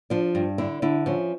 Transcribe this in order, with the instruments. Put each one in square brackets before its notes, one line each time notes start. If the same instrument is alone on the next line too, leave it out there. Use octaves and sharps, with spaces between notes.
[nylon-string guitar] F3 D4
G2
D3 E4
D3 E4
F3 C#4